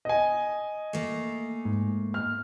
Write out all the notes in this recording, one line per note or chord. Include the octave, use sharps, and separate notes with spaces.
D#5 G#5
A3 A#3
G#2
F6